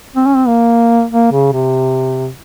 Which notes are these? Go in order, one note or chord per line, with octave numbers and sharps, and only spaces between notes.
C4
C#4
C4
A#3
A#3
C#3
C3